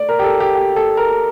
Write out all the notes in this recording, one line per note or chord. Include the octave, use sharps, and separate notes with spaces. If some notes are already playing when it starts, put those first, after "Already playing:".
Already playing: A3 D5
A#4
G4
A4
G4
G4
A4
A#4